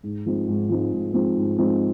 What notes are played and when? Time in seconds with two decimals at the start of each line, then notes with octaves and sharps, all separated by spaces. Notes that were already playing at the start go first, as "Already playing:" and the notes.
0.03 G#2
0.26 F3 G#3 C4 D#4
0.48 G#2
0.69 F3 G#3 C4 D#4
0.92 G#2
1.13 F3 G#3 C4 D#4
1.35 G#2
1.58 F3 G#3 C4 D#4